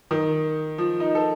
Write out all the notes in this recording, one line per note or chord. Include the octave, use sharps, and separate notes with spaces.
D#3
F3
D#4
A4